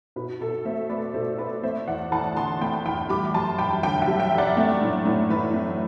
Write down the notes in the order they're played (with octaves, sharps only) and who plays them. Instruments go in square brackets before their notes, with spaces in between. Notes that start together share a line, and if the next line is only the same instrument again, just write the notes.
[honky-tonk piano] B2 B4
B2 A4
A3 C5 E5
A3 B4 D5
B2 A4 C5
B2 B4 D5
A3 C5 E5
E2 D5 F#5
E2 F#5 A5
D3 A5 C6
A3 G5 B5
E2 G5 B5
G3 B5 D6
F#2 A5 C6
F#2 G5 B5
D3 G5 B5
E5 G5
G3
E5 G5
F#2
D5 F#5
A3
A2
A2
E3 B4
A3